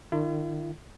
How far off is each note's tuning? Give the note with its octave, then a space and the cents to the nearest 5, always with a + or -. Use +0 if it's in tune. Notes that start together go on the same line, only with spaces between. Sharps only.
D#3 -35 E4 +45